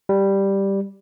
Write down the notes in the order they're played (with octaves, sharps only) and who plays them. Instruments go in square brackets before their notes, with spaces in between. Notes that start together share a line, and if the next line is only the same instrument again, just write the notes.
[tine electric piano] G3